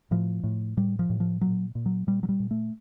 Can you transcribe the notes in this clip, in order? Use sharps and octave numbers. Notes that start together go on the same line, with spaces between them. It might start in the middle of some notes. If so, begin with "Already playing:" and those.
A2 F3
A2
A2 G3
F3
A2
F3
A#2 F#3
A#2
F#3
A#2 G3
F#3
G3
A#2
A3